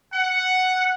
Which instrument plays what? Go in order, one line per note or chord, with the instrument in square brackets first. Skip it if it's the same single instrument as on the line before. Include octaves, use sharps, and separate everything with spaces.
[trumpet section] F#5